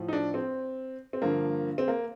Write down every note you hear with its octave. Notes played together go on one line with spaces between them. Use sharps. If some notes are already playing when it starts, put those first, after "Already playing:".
Already playing: A2 F3
D#4
D4
C4
C4
G2 D3 F3 A#3
C4
A#3